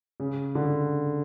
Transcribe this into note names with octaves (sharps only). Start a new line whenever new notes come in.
C#3
D3